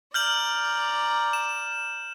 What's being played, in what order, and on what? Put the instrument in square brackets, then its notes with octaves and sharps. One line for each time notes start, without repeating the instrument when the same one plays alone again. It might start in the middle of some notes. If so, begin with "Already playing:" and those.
[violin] D5 A#5 [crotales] F6 G6 F#7
[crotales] E7